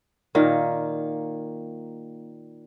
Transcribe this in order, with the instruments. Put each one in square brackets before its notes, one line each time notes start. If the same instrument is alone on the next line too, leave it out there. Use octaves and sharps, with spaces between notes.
[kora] A#2 D#3 A#3